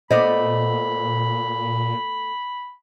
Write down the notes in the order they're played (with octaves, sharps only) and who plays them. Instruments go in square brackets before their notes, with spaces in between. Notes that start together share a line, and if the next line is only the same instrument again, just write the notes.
[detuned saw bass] A#2 [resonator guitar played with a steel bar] A3 B3 D5 [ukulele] C5 D#5 [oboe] B5